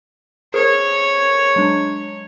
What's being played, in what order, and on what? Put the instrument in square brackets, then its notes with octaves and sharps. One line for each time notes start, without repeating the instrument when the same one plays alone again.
[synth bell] G#4 A#4 C5 [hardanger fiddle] C#5
[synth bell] F#3 G#3 D4